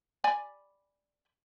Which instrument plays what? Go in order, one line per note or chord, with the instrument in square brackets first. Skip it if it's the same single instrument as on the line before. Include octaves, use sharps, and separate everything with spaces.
[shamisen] D5 G#5 B5